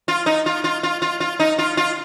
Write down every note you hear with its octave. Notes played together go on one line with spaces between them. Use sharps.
F4
D#4
F4
F4
F4
F4
F4
D#4
F4
F4